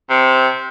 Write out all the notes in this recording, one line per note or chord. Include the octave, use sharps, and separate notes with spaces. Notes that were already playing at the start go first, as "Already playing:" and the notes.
C3